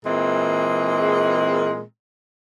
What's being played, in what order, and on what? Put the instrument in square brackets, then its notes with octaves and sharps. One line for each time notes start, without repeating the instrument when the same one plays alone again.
[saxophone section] A#2 E3 G#3 C4 G#4